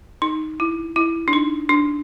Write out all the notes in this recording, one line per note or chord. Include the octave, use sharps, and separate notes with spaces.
D#4
E4
E4
D4
D#4
D4